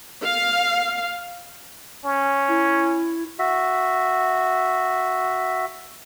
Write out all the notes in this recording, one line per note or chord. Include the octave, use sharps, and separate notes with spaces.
F5
C#4
E4
F#4 E5